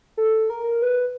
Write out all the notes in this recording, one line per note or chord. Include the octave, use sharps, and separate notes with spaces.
A4
A#4
B4